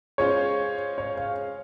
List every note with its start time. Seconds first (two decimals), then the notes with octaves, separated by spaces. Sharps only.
0.18 G#3 C#4 F4 C5 C#5
0.98 C#5
1.17 F5